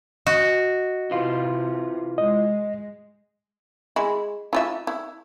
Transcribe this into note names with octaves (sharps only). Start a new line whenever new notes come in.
F#4 D#5
C3 E3 F4
G#3 D#5
G#3 E4
E4 F4 E5
E4